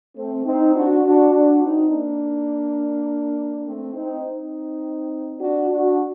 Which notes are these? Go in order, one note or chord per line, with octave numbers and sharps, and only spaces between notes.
A3 C4
C4 D#4
D4 F#4
D4 F#4
D4 F#4
C4 D#4
A#3 D4
A3 C4
C4 D#4
C4 D#4
D4 F#4
D4 F#4